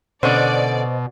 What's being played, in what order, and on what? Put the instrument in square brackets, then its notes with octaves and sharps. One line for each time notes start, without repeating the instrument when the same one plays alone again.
[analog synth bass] B2 [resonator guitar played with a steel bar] D3 C#4 [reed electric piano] C5 D#5 [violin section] D5